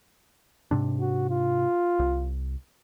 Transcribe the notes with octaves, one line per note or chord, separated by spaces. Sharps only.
G#2 C3 D4
F#4
F4
C2